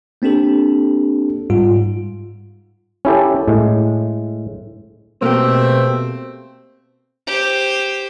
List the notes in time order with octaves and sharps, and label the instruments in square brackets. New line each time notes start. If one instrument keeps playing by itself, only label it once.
[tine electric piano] A#3 C4 D4 G4 A4
G#2 G3 F4
[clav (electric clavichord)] C#4 E4 G4 A4
A2 G#3
[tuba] B2 [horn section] A3 C4 [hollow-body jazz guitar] A#3 G4
[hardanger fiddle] G4 C5